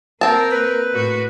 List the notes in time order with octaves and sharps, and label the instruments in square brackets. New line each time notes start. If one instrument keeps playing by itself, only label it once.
[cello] A#3 A#4 [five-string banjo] C4 A5
[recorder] B4
[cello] A2 F#4